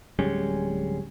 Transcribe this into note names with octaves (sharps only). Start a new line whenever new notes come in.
D1 G3 G#3 C#4